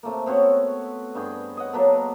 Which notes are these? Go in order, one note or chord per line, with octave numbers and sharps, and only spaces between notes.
C3 A3 A#3
B3 C4 F#4 C#5
G2 G#4 G5
D#5 F#5
F#3 A#3 B3 A4